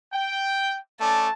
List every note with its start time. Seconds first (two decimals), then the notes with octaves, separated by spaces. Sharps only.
0.13 G5
1.00 A3 C#4 D5 A5